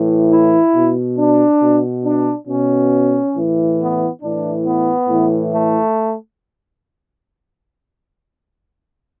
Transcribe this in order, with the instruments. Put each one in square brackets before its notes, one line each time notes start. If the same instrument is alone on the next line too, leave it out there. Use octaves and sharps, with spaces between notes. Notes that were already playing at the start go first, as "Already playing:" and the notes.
Already playing: [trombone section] A2 E3
E4
B2
D4
B2
D4
B2 C#4
A2 E3
B3
A2 E3 D4
B3
A2 E3
A3